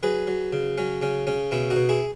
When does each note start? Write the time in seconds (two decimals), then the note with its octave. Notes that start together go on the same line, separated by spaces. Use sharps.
0.03 F#3 G#4 B4
0.27 F#3
0.53 C#3
0.78 F#3 C#4
1.02 C#3 C#4
1.27 C#3 C#4
1.51 B2 C#4 E4
1.70 D#4 F#4
1.76 B2
1.89 E4 G#4